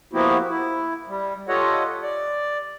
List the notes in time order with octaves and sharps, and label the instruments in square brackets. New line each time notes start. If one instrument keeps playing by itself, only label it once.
[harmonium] F3 A#3 B3 E4 F#4 G4
E4
G3
F4 G4 A4 C#5 D#5 F#5
D5